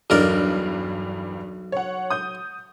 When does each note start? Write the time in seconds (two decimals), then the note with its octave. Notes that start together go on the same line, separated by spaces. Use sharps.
0.10 B1 E2 G2 A#4 D5
1.72 C#5 F#5
2.10 D#6 G6